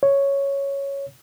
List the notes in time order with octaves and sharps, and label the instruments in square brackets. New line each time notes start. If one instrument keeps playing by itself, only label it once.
[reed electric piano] C#5